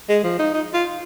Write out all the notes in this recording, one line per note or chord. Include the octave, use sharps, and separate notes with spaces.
G#3
F3
D#4
D#4
F4